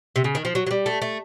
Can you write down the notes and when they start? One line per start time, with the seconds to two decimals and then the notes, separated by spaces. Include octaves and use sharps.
0.16 C3
0.24 C#3
0.35 D#3
0.45 F3
0.55 F#3
0.67 F#3
0.71 G3
0.86 A3
1.02 A3